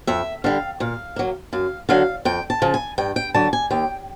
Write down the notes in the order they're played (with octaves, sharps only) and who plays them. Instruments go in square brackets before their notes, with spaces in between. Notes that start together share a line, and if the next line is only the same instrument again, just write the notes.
[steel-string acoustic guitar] F2 E5
D3 G3 F5
A#2 F5
F#3 A#3
F#2 F5
D3 F#3 F5
F2 G5
A5
C#3 F3
G#5
G2 G5
G5
D3 F#3 A5
G#5
D#2 G5